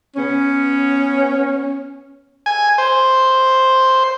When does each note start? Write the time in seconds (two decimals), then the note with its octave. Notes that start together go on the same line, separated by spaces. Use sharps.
0.16 B3 C#4
2.46 G#5
2.78 C5